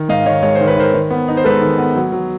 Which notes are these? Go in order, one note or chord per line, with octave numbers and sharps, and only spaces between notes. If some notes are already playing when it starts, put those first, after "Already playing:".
Already playing: D#3
G#2 D#5 F5
D#3 C#5 D#5
G#3 C#5
C5
D#3
B4
D#3 A#4 C5
D#3
B3
D#4
C5
G#3 A4 B4
D#3
B3
F#3
F#3